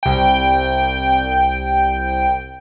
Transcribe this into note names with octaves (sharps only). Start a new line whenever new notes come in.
C2 G5